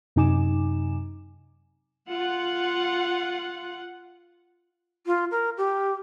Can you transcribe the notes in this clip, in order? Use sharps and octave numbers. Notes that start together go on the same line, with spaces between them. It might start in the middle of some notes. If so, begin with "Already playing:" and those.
F#2 C3 D#4 G#5 D6 E7
F4 F#5
F4
A#4
G4